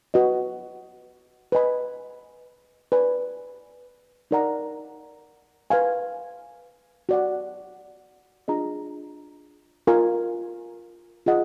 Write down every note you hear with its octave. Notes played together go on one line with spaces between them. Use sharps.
F#4 B4 D#5
B4 D#5 G#5 B5
B4 D5 G#5 B5
D#4 A#4 D5 F#5 A#5
B4 F5 G#5
F#4 D5 F#5
D4 F4 G#4 D#5 A#5
F4 A#4 F5 G#5
F4 G#4 D#5 F#5